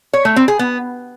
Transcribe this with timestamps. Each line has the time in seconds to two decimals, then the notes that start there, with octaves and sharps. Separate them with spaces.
0.13 C#5
0.25 A3
0.36 C4
0.48 G#4
0.59 B3